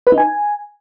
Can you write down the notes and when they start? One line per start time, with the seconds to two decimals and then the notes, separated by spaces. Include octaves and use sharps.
0.07 B4
0.12 D#4
0.18 G#5